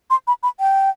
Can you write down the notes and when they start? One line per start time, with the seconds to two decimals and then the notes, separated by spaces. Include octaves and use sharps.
0.10 C6
0.27 B5
0.43 B5
0.60 G5